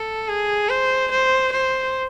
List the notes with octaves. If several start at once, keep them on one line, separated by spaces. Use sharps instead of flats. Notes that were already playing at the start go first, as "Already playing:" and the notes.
Already playing: A4
G#4
C5
C5
C5